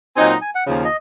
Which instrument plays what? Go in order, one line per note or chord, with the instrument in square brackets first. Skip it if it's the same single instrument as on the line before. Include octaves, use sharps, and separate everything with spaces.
[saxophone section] A#2 F#3 C4 D#4 [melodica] G#5
[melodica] A#5
G#5
F#5
[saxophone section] D#2 C#3 F3
[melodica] D#5